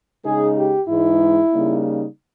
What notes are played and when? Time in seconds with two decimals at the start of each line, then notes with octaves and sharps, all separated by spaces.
0.25 C#3 G#3 D#4 G#4
0.57 G4
0.89 G#2 E3 G#3 D#4 E4
1.54 C#3 G3 A#3 D#4